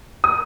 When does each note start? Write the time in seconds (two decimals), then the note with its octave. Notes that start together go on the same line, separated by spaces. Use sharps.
0.24 D#6